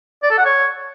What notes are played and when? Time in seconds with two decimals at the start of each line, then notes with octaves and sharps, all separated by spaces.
0.23 D5
0.30 A4
0.38 F#5
0.45 C#5